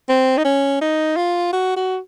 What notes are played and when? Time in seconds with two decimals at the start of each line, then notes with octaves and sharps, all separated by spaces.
0.09 C4
0.38 D#4
0.45 C#4
0.81 D#4
1.16 F4
1.53 F#4
1.76 F#4